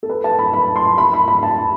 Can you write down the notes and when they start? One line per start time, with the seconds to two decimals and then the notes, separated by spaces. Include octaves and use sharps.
0.03 A4
0.09 B4
0.24 A5
0.39 B5
0.54 B5
0.76 C6
0.98 B5
1.13 B5
1.28 B5
1.43 A5